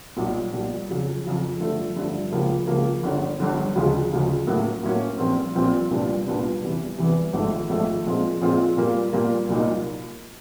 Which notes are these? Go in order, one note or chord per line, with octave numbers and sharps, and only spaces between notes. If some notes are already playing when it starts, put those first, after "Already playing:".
B1 A#2 G3
B1 A#2 G3
F2 C#3 F#3
F2 C#3 F#3
G2 D3 F3 A3
G2 D3 F3 A3
C#2 C#3 F3 A#3
C#2 C#3 F3 A#3
G1 G2 D3
G1 G2 D3
D2 C#3 F3 G#3
D2 C#3 F3 G#3
A2 F#3 A#3 C#4 F#4
A2 F#3 A#3 C#4 F#4
A#1 A#2 G3 C4
A#1 A#2 G3 C4
C2 A#2 G3 B3 D4
C2 A#2 G3 B3 D4
E2 C3 E3 G3 B3
E2 C3 E3 G3 B3
G#1 G#2 F3 A3
G#1 G#2 F3 A3
A#2 F3 G#3 C4 F4
A#2 F3 G#3 C4 F4
A#2 G3 A#3
A#2 G3 A#3
C2 A#2 F#3 A#3 D#4